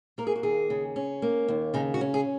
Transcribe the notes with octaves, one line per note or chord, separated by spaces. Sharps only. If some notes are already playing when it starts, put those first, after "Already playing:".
A#3 A#4
G#4
F#4
D#2 G#4
C#3
C#4
A#3
D#2
C#3 D#4
F#4
C#4
G#4